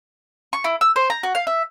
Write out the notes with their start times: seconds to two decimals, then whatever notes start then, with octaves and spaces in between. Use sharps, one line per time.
0.53 C#6
0.64 E4
0.81 E6
0.96 C5
1.10 A#5
1.23 F#4
1.35 F5
1.47 E5